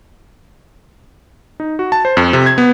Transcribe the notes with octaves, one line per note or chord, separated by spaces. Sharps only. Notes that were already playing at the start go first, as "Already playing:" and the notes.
D#4
F#4
A5
C5
F2
C3
G#6
B3